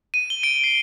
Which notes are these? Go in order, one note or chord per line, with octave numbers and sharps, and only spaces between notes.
D#7
G7
D7
C7